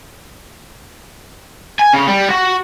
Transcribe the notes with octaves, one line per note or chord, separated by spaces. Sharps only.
G#5
C#3
G3
F#4